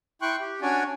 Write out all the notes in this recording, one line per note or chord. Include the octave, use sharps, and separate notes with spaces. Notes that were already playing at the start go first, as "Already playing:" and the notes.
E4 G5 C6 C#6 F#6
G4
C#4 D4 F#4 C#5 D5 G#5